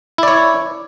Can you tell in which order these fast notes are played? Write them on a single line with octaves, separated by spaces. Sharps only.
E4 D5 C#5